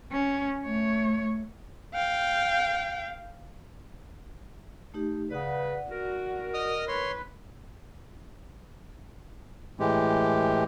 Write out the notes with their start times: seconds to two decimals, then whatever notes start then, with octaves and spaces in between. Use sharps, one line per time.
0.12 C#4
0.65 A3 C#5
1.94 F5 G5
4.94 A3 D#4 G4
5.31 C#3 B4 D5 F#5
5.91 F#4 A#4
6.54 D#5 D#6 F6
6.88 B4 C#5 C6
9.80 A2 E3 G#3 G4